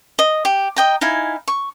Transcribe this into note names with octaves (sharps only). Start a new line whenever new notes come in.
D#5
G4
D#5 G5 A#5
D#4 E4 F5 G#5
C#6